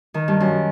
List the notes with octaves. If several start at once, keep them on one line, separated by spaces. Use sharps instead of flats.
D#3
G2
F#2